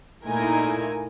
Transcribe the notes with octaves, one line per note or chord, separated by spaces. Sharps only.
A#2 A3 D#4 E4 A#4 G#5